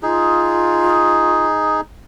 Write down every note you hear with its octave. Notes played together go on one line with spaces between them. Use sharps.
D#4 F4 G#4